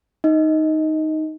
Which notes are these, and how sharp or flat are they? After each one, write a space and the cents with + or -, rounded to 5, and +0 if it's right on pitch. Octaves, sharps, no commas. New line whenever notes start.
D#4 +0 D#5 +20